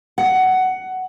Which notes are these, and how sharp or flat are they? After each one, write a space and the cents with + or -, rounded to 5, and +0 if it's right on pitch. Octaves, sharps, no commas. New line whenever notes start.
F#5 +10